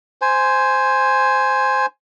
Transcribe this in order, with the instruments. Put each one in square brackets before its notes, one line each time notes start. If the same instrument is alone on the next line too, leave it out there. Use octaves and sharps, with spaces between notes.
[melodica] C5 G#5